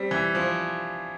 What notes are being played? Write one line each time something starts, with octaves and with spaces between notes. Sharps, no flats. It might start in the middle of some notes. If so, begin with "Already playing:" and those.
Already playing: G3 C4
E3
F3